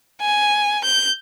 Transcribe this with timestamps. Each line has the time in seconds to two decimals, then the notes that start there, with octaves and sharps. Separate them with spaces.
0.22 G#5
0.84 G6